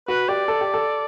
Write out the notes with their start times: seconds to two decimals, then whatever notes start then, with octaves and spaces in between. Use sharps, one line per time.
0.08 F#4 B4
0.29 G4 D5
0.48 A4
0.61 G4
0.74 A4